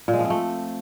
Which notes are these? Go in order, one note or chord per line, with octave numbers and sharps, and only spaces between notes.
A#2
G#3
F3
C4
A3